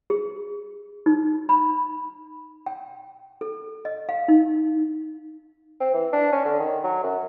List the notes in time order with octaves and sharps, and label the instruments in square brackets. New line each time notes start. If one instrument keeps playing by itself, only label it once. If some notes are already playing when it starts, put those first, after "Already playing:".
[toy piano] G#4
D#4
B5
G5
A4
D#5
F5
D#4
[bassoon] C4
E3
D4
C#4
D3
D#3
F#3
F#2